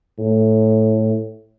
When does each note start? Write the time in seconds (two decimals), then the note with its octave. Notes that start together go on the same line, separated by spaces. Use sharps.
0.19 A2